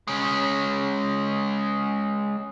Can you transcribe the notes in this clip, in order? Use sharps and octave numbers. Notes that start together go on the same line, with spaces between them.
G#3 C#4